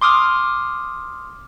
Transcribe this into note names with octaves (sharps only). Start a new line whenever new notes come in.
C6 D6 D#6 F6